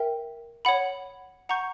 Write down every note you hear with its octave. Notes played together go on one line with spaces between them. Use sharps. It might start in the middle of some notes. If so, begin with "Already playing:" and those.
Already playing: A#4 E5 G5
C#5 F#5 B5
F#5 A#5 C#6 G6